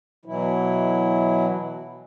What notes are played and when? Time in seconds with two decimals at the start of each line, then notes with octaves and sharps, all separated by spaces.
0.25 B2 E3 F#3 E4